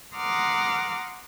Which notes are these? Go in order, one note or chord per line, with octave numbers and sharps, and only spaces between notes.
F#5 A#5 C6 D6 D#6 F6